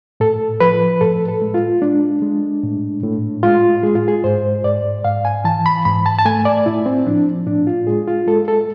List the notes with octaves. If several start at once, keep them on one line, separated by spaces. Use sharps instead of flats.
A2 A4
F3 B4
A2 A4
A4
G#3
F4
G#3 D4
G#3
A2
A2
G#3 F4
G#3 G#4
F4
G#4
G#2 C5
G#2 D5
G#2 F5
G#5
E3 A5
B5
G#2 B5
A5
A5
A3 G#5
D5
A2 E4
C4
F3 D4
A2 D4
F4
G#3 G#4
F4
G#3 A4
A4